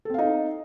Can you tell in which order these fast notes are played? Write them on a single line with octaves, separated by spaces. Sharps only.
A4 C4 F5 D#4